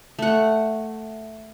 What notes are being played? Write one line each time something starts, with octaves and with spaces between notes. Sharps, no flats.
A3 F#5